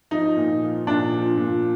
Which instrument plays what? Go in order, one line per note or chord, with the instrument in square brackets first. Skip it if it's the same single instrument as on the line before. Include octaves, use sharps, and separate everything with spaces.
[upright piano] F3 D#4
A#2
F3
A#2 D4
F3
A#2